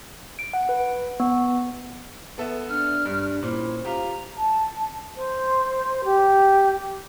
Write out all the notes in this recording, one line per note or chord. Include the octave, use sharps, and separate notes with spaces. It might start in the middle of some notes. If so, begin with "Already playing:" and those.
D7
F#5
B4
B3
B3 A4 E5
D4 F6
G2
A#2 C#4 E4 C5
F4 G4 A#5
A5
C5
G4